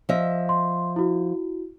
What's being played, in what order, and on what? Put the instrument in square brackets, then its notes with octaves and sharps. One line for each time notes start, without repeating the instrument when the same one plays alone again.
[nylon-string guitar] F3 D#5 E5
[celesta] C6
E4 F#4